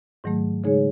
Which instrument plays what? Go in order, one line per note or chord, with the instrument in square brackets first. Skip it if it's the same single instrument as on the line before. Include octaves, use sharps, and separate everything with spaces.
[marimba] G#2 D#3 F#3 A3
C#3 G#3 D#4 G#4 C#5